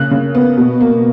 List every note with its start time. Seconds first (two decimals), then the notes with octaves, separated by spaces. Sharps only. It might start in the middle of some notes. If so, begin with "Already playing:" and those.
Already playing: C#3 A#3 F#6
0.11 C#3
0.35 B3
0.58 B2
0.81 A#3